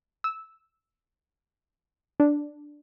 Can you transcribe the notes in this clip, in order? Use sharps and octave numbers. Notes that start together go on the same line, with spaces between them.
E6
D4